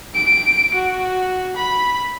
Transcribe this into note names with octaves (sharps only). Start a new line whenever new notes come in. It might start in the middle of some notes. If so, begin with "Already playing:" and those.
D7
F#4
B5